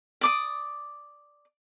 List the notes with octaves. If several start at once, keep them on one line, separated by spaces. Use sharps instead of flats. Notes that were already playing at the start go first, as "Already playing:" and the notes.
D5 D6 D#6